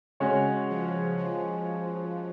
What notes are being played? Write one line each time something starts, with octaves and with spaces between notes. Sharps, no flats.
C#3 G#3 C#4 F#4 C#5
F3
F3